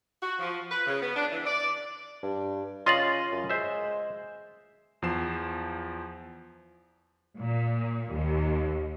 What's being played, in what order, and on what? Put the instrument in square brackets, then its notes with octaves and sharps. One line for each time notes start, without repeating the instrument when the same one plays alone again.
[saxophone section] F#4
F3
B4
C#3
B3
D4
E3
D5
[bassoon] G2
[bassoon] C#3 [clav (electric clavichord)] F4 D#5 F5 [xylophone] C6 A6 F#7
[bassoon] F#2
[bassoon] G#3 [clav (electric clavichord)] C5 E5
[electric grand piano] E2 F3 C7 E7
[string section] A#2
D#2